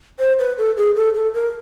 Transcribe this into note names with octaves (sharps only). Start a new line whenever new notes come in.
C5
B4
A4
G#4
A4
A4
A#4